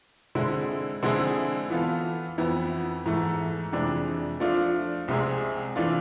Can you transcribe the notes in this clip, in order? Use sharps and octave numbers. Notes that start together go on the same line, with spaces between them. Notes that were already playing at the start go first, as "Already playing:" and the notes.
D3 G#3 C4 E4
D3 G#3 C4 E4 G#4
E3 B3 F4 A4
F2 E3 B3 E4
G#2 E3 A3
F2 C3 E3 G#3 D4
F3 A3 D4 F4
C2 C3 G#3 C4 G#4
C3 E3 A3 D4 F4